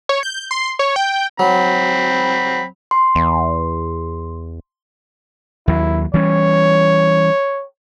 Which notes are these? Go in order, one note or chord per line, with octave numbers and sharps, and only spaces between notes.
C#5
G6
C6
C#5
G5
F#3 C4 B5
C6
E2
D#2 F#3 E4
E3 G3 C#4 C#5